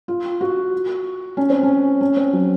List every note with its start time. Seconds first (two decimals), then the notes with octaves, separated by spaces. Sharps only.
0.08 F4
0.41 F#4
1.37 C#4
1.50 C4
1.63 C#4
2.01 C#4
2.17 C4
2.33 F#3